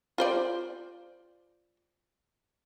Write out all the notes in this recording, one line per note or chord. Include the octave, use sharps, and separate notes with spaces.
F4 C5 D5